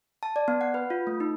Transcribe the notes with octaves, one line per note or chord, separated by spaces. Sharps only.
A5
D5
B3
F#5
B4
F4
A3
D#4